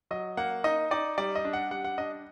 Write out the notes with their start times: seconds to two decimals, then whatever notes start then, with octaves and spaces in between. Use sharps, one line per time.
0.11 F#3 D#5
0.37 A#3 F#5
0.64 D#4 D#5
0.91 D#4 D5
1.18 G3 D5
1.35 D#5
1.45 D4
1.53 F#5
1.71 G3 F#5
1.84 F#5
1.98 D4 D#5